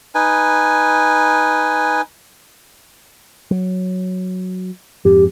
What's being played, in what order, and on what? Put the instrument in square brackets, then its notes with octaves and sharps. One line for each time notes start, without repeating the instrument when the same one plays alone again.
[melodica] D#4 B4 G#5
[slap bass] F#3
[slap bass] F2 G#2 [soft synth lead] G4